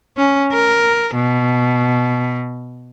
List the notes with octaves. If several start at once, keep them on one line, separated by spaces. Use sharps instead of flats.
C#4
A#4
B2